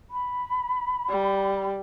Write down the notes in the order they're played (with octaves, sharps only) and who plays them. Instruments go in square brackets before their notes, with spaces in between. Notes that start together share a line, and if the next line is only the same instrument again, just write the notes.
[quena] B5
[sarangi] G3